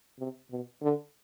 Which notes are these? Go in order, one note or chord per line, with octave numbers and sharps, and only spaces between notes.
C3
B2
D3